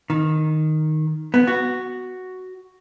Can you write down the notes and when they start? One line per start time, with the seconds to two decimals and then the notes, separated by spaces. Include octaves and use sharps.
0.10 D#3
1.34 B3
1.47 F#4